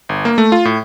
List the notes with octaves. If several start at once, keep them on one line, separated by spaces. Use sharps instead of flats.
G1
A#3
A3
F4
A2